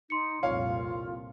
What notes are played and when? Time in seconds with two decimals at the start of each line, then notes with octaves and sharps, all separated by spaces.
0.10 D#4 C6 C#7
0.43 C2 F2 A#2 F4 C#5 F5